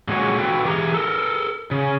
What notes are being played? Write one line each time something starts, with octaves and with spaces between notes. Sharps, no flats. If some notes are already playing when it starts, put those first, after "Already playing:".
A#2 D3 G#3 F#4 G#4 C#5
D3 F#4 A4 B4 G5
E3 G4 G#4 A#5
A4 A#4
C#3